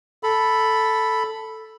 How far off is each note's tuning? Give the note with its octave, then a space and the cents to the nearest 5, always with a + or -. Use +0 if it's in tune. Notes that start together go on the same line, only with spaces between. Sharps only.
A4 +0 B5 +0